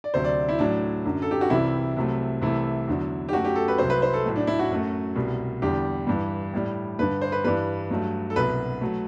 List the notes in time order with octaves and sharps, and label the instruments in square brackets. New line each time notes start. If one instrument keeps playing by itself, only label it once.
[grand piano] D5
D2 C3 F#3 C5
D5
E4
A2 F#3 A3 D4
F#2 D3 F#3
A4
G4
F#4
C2 C3 E3 G3 E4
C2 C3 F#3 A3
C2 C3 E3 A3 E4
E2 D3 F#3
G4
F#2 F#3 A3 F#4
G4
A4
B4
C2 C3 F#3 C5
B4
C5
A4
A2 F#3 A3
D4
E4
F#4
F#2 F#3 A3
C2 B2 G3
E2 D3 G3 G4
G2 E3 G3
A2 G3
G2 D3 G3 B4
C5
B4
G2 E3 G3 B4
G2 F#3 A3
A4
C2 B2 F#3 B4
F#3 A3